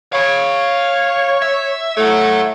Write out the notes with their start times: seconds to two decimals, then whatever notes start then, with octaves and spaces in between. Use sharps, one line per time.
0.13 C#5 F5 B5
1.42 E5
1.97 A2 A3 C#5 F#5